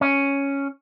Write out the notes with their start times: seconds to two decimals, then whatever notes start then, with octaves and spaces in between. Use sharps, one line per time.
0.01 C#4